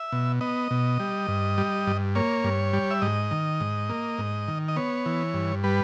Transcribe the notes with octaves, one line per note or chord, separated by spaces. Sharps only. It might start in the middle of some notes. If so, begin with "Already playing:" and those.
Already playing: E5
B2
B3 D#5
B2
G3
G2
G3
G2
A#3 C#5
G2
G3
E5
G#2 D#5
D#3
G#2
A#3
G#2
D#3
D#5
B3 C#5
E3
G2
G3 B4